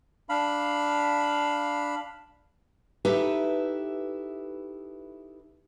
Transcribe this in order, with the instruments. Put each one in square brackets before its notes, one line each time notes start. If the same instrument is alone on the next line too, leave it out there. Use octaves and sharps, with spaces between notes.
[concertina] D4 F5 B5
[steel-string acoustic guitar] D#4 E4 G4 A4 B4 E5